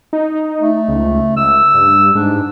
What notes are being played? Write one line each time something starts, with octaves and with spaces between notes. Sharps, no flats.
D#4
A3
C#2
C#2 E6
G2
G#2 D4